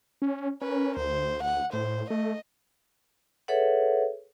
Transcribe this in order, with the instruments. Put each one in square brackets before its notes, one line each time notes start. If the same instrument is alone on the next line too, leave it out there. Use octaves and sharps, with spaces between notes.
[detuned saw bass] C#4
[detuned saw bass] C#4 [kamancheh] A#4 B4
[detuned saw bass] D2 [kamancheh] C5
[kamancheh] F#5
[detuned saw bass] A2 [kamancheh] C5
[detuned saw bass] A3 [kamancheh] D#5
[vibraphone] G#4 A4 B4 C#5 E5 F#5